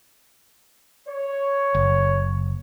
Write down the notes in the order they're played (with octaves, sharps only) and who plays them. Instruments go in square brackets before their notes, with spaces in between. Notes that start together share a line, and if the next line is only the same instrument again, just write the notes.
[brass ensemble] C#5
[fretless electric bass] F#1